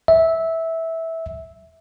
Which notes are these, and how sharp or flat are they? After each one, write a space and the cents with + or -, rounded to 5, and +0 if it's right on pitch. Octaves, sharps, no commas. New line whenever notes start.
E5 -15